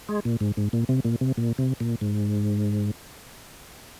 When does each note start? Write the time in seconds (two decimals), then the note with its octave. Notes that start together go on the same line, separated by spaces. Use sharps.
0.09 G#3
0.25 A#2
0.41 G#2
0.57 G#2
0.73 A#2
0.89 C3
1.05 A#2
1.21 C3
1.37 A#2
1.58 C3
1.80 A#2
2.01 G#2